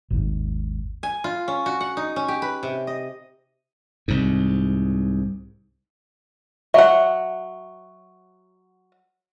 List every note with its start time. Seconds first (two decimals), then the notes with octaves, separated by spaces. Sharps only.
0.11 G#1 D#2 G#2
1.03 G#5
1.24 F4
1.48 C#4
1.66 F#4
1.81 F#5
1.97 D#4
2.16 C#4
2.28 G4
2.42 B4
2.63 C3
2.87 D#5
4.08 C2 G#2
6.74 F#3 E5 F#5